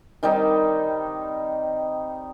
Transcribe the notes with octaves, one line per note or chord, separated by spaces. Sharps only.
D#3 G3 C4 D#4